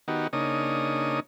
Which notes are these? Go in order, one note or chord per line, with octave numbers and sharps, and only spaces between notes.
D#3 B3 D#4 F#4 G4
C#3 A#3 D4 D#4 C#5 D#6